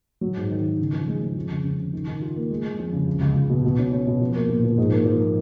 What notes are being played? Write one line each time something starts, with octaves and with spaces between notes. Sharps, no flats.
F#3
G#2
D#3
D#3
C#3
F3
G#3
G#3
F2
C#3
C#3
C#3
D#3
D#3
F4
A#3
G#3
G#3
F2
C#3
C#2
C#2
C#2
B2
B2
C#4
C#4
B2
F3
A#3
A#2
F3
G#2
A#3
F3
A#3